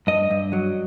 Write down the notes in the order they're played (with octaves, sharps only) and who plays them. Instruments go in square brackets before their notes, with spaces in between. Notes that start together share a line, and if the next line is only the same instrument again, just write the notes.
[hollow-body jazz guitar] G2 D#5
G2
F#3